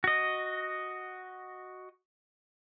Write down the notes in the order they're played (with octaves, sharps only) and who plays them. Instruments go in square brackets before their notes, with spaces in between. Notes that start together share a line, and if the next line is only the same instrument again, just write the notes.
[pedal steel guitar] F#4 D#5